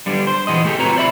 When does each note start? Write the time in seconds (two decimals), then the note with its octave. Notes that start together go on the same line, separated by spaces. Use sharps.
0.06 D3 G3 D4 G4
0.27 C5
0.47 E3 F#4 G#4 D#5
0.65 A3 G4 A4
0.79 C4 F4 F#4 B4 C#5 A#5
0.96 C5 D5 E5 B5